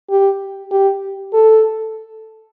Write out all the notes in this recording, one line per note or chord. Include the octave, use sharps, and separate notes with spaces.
G4
G4
A4